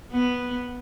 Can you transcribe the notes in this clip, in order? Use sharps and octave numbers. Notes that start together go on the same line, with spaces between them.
B3